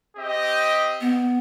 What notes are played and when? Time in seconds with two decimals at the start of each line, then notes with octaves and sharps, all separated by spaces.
0.17 C4 G4 D#5
1.01 B3